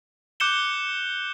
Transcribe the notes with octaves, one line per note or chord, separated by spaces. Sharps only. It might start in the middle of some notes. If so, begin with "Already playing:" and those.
D6 F#6 G6 C#7 E7 G7